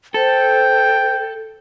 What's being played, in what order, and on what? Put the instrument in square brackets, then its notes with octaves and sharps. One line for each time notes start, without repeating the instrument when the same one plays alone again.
[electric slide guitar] A4 [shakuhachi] C5 [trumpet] G5